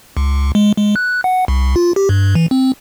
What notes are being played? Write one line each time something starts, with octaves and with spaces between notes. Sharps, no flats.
C#2
G#3
G#3
F#6
F#5
C2
F4
G4
G2
E3
C4